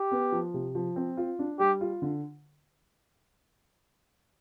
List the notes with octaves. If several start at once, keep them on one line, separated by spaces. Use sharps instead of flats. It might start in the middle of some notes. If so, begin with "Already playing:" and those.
Already playing: G4
B3
F3
C3
F3
C4
F4
D4
G3 G4
F4
D3